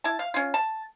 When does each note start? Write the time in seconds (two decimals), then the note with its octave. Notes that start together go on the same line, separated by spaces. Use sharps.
0.04 E4 A5
0.19 F5
0.34 C#4 F4
0.54 A5